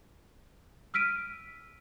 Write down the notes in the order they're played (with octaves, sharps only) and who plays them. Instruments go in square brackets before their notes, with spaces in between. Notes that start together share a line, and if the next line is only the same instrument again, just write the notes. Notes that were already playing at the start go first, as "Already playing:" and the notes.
[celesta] E6 F6 B6 D7 D#7